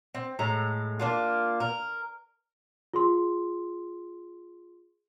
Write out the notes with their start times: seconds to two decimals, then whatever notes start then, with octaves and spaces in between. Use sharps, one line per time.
0.15 C4
0.39 A2 G#3 A#5
1.00 A#3 D4 F4
1.60 A#4
2.93 F4 G#4 C6